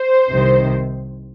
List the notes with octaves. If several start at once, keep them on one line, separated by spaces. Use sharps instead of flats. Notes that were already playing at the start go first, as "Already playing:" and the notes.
Already playing: C5
C2 C3 D#3